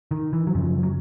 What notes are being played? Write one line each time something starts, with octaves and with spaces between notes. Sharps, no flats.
D#3
E3
F#3
F#2 C#3 F3
F#3